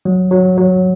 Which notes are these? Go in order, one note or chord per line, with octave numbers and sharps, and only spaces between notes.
F#3
F#3
F#3